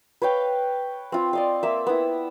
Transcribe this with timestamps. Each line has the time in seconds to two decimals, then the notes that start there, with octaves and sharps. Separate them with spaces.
0.22 B4 C#5 F5 G5
1.12 C4 F4
1.33 D5 D#5 F5
1.63 A#3 E5
1.87 B3 E4